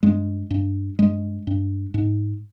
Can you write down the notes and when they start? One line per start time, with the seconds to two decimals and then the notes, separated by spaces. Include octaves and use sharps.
0.03 G2 G#3
0.51 G2
0.99 G2 G#3
1.47 G2
1.94 G#2